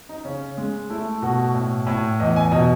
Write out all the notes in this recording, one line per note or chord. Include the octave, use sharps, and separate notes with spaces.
D#4
C#3 C#4
G#3
A3 E4
B2 F#4
A2
A2
E2 D#5
G#5
B2 D#5